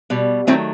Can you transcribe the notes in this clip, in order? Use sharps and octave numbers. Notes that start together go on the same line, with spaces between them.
B2 G3
D#3 F#3 A3 C4 E4